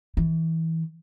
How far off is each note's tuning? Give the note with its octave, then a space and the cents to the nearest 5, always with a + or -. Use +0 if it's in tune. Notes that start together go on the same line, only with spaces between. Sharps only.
E3 -25